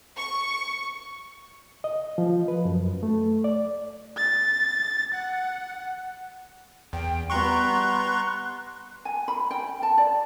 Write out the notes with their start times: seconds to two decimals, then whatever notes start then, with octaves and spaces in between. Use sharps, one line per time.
0.16 C#6
1.84 D#5
2.18 F3
2.48 B4
2.65 F#2
3.03 A3
3.44 D5
4.17 A6
5.14 F#5
6.93 E2 G5
7.30 G3 B3 A#5 C6 C#6 F#6
9.05 G#5
9.28 B5
9.51 G5
9.83 A5
9.98 D5